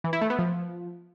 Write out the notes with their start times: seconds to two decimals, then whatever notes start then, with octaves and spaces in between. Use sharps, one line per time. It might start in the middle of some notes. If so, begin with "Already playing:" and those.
0.04 E3
0.13 E4
0.21 A3
0.30 B3
0.39 F3